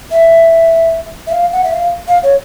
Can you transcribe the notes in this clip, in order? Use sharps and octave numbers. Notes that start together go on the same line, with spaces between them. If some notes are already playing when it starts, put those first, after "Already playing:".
E5
E5
F5
F#5
E5
F5
F5
C#5